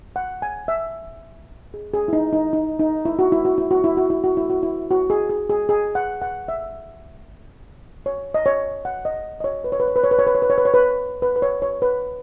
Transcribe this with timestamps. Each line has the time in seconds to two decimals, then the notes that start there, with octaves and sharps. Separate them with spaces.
0.16 F#5
0.42 G#5
0.68 E5
1.74 G#4
1.94 G#4
2.08 E4
2.13 D#4
2.33 D#4
2.53 D#4
2.79 D#4
3.05 E4
3.19 F#4
3.32 E4
3.45 F#4
3.58 E4
3.71 F#4
3.84 E4
3.97 F#4
4.10 E4
4.24 F#4
4.37 E4
4.50 F#4
4.63 E4
4.91 F#4
5.10 G#4
5.29 G#4
5.49 G#4
5.69 G#4
5.95 F#5
6.22 F#5
6.48 E5
8.06 C#5
8.34 D#5
8.46 C#5
8.85 F#5
9.05 D#5
9.40 D#5
9.44 C#5
9.64 B4
9.72 C#5
9.80 B4
9.88 C#5
9.96 B4
10.04 C#5
10.11 B4
10.19 C#5
10.27 B4
10.35 C#5
10.42 B4
10.50 C#5
10.58 B4
10.65 C#5
10.74 B4
11.22 B4
11.36 B4
11.42 C#5
11.62 C#5
11.82 B4